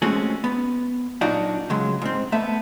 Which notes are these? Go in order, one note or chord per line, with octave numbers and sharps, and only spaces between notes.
G#3 A3 C4 C#4 F#4 G#4
B3
A#2 F#3 A#3 D4 D#4 F#4
C#3 F#3 G#3
G#2 C4
A3 B3 E5